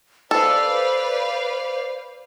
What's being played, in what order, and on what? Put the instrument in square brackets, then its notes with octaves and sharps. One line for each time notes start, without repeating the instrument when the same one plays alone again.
[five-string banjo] A4 [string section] B4 D5 F5 [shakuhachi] C5